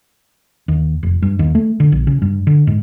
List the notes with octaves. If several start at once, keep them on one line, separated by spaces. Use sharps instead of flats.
D#2
F1
G2
D#2
A3
D3
A#1
C#3
G2
D3
G#2